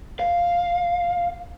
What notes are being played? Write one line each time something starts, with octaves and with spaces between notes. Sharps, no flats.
F5